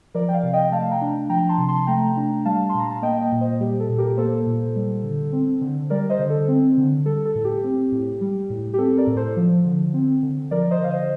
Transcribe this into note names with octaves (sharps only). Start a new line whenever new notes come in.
F3 A#4 D5
G5
D5 F5
C3
D#5 G5
A3 F5 A5
G5 A#5
D4
F3 G5 A#5
A5 C6
C3
A5 C6
A3 G5 A#5
D4
G3 F5 A5
C6
A#2
A#5
A5
A#3 D#5 G5
D#5 G5
A#2
C5 D#5
G3 G4
A4
A#2
G4 A#4
A#3 A4 C5
A#2
G3
D3
C4
D3
G3 A#4 D5
C5 D#5
D3
A4
C4
D3
G3 A4
A4
A2
G4
C4
A2
G3
A2
G4
C4 A4
A#4 D5
A2
A4 C5
F3
D3
C4
D3
F3 A#4 D5
C5 D#5
D3 F5
C5 D#5